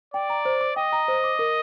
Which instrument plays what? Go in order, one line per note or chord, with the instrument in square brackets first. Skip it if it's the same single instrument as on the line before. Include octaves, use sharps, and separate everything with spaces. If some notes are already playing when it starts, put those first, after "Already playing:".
[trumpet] D5 [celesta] G5
[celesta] A#5
C5
D6
[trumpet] D#5 [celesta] G5
[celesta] A#5
C5
D6
A#4